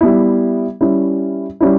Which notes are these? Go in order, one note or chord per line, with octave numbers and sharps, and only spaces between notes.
G3 B3 E4
G3 C#4 E4
G3 C#4 E4